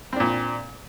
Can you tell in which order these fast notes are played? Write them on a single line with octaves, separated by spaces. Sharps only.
C4 D4 A#2